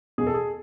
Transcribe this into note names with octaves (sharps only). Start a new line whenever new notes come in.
E2 B2 G#4
A4
G#4